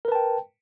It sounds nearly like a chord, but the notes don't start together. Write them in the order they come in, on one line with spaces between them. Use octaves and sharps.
A#4 B4 A5 G5